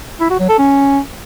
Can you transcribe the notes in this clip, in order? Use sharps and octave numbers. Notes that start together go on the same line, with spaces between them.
E4
F#4
F#3
A4
C#4